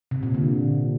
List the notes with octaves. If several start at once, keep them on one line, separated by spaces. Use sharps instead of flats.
C3
A#2
D3